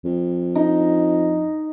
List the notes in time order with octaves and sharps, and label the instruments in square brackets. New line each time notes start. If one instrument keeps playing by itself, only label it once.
[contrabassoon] F2
[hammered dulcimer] D#4